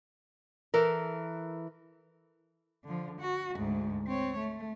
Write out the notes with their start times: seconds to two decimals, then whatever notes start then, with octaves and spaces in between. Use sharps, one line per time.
0.74 E3 A4 A#4
2.84 D3 F3
3.21 F#4
3.57 D2 G#2
4.07 C4 C#5
4.38 A3